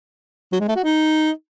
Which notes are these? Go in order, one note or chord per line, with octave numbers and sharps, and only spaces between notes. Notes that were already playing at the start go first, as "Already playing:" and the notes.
F#3
G#3
A3
F#4
D#4